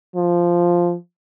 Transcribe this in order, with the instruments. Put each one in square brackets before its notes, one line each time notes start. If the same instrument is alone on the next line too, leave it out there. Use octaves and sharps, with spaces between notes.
[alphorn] F3